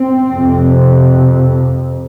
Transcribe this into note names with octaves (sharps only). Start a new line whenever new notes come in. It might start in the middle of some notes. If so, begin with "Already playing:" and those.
Already playing: C4
F2 C3